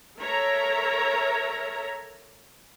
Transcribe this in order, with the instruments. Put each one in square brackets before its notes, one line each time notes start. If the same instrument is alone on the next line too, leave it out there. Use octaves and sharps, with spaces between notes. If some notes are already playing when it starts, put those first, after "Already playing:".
[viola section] A4 A#4 C#5 E5 A#5